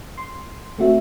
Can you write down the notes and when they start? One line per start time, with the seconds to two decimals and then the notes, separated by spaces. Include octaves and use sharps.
0.18 C6
0.79 A3 C4 F#4 E5